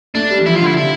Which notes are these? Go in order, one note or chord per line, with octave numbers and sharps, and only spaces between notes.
A3 D4
G3
E3
F3 E4
F4
D3
E4
C3 E4